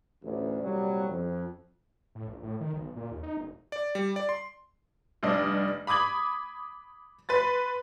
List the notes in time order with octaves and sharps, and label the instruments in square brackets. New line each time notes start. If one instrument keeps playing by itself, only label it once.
[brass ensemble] A1 D2
C2 A#2 F#3 G3
F2
[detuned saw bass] A2
A#1
A2
D#3
B1
A#2
D#2
D#4
E1
[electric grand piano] D5
G3
D5
C6
[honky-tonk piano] F1 G2 D4 D#5
B5 D6 D#6 G#6 F#7
B4 C6 A6